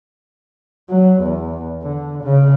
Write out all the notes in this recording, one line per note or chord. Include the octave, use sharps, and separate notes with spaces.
F#3
E2
D3
C#3